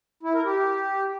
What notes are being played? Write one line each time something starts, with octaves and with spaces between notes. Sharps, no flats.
E4
A#4
G4